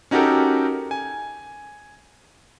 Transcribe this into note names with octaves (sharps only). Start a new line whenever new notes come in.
C#4 D#4 F#4 G4 A4 A#4
G#5